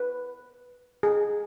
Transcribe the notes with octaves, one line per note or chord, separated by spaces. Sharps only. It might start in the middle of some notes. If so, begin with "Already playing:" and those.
Already playing: B4
G#4